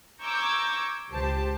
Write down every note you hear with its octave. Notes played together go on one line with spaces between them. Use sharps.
A#5 C#6 D6 E6 G6 G#6
C#2 G4 C5 A5